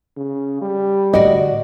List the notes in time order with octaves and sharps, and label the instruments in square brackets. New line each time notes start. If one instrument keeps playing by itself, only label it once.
[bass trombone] C#3
G3
[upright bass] A2 D3 [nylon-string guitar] F#4 D5 [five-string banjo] D#5